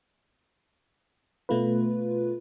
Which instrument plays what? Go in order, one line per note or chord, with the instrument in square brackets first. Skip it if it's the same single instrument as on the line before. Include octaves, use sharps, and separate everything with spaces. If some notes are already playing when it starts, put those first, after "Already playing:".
[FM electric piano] B2 A3 F4 B4